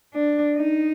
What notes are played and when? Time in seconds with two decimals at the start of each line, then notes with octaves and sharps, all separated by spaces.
0.14 D4
0.56 D#4